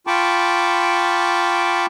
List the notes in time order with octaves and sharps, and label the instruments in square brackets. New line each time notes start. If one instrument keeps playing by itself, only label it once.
[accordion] F4 G5 A5 B5 C#6 D6